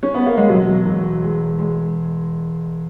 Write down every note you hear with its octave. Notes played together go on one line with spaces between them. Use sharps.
C#4
B3
A#3
G#3
E1 F#3
E1
G#3
G#3